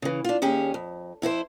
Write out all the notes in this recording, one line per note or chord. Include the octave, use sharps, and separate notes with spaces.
C#3 E3
D4 F4
D#2 C#4 G4 G#4
F2
F2 E4 F#4 C5